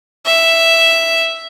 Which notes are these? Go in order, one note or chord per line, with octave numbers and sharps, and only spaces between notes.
E5